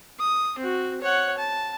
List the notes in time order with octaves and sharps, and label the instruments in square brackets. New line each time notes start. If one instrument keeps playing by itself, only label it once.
[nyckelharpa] D#6
C4 F#4
C#5 F#5
A5